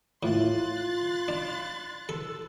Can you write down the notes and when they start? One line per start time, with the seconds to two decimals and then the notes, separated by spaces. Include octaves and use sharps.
0.23 A2 F4 C6 F#6 A6
1.28 D4
2.09 A4 E6